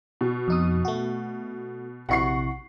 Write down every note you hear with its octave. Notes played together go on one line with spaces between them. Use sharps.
B2
F2 D#4 D#6
A3 F#4
A#1 C3 E4 F#5 C#6 C7